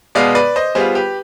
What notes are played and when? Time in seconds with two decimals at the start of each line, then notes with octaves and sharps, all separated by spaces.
0.15 B2 G#3 B3 D5 F5
0.35 B4 D5
0.56 C5 D#5
0.75 G3 B3 F4 G#4 C5
0.95 G4 B4